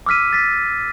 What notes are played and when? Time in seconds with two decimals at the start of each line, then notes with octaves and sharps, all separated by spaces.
0.06 D6 E6 F6 B6 D#7
0.33 A6 B6